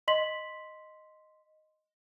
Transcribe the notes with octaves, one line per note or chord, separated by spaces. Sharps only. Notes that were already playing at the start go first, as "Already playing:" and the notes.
D#5 C6 B6 F#7